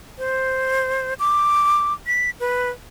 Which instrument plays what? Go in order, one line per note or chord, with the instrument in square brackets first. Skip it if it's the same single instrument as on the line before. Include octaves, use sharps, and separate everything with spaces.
[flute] C5
D6
B6
B4